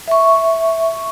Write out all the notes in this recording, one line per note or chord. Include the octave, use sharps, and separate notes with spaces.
E5 C#6